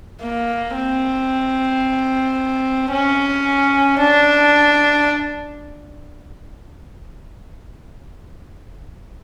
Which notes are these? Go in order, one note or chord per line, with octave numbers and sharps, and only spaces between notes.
A#3
C4
C#4
D4